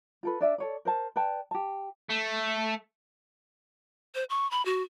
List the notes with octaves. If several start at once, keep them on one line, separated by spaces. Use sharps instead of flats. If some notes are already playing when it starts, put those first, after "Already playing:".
F4 A4 B4
D4 D5 E5
A4 C#5 D5
A#4 C5 A5
B4 D5 G5 A5
G4 A5
A3
C5
C#6
B5
F#4